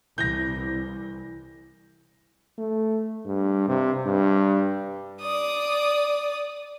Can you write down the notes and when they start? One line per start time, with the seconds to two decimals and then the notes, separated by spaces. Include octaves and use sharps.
0.18 C2 E3 G6 A#6
2.58 A3
3.25 G2
3.68 C3
4.06 G2
5.22 D5 D#6